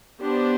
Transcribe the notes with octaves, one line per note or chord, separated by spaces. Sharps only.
B3 D4 G4 C5